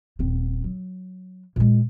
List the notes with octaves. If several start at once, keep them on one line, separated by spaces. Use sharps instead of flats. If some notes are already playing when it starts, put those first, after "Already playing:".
D#1 C4
F#3
A#2 G#3